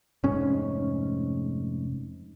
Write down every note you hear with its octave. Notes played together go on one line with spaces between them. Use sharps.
F1 G#2 C#4